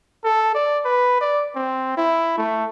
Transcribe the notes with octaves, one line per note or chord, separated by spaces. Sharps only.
A4
D5
B4
D5
C4
E4
A3